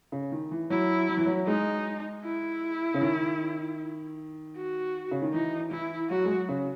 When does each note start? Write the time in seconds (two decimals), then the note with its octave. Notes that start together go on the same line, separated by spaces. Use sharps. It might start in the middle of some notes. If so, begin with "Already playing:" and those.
0.12 C#3
0.32 D#3
0.51 E3
0.70 F#3 E4
1.09 F#3
1.17 E3
1.26 F#3
1.47 G#3 D#4
2.25 E4
2.94 C#3
3.01 D#3
4.56 F#4
5.11 C#3
5.22 D#3
5.33 E3 D#4
5.71 E3 E4
6.10 F#3 F#4
6.25 G#3
6.29 F#3
6.49 C#3